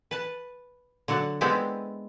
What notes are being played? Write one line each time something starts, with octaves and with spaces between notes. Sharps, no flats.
B4 A5
D3 F#3 F#4 A5
G#3 B3 C4 D4 E4 G4